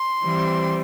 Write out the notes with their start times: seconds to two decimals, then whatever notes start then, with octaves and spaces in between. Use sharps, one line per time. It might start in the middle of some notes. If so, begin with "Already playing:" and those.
Already playing: C6
0.24 E3 G3 C4